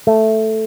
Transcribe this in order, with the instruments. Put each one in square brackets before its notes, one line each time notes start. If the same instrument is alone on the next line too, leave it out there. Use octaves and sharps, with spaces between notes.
[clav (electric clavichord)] A3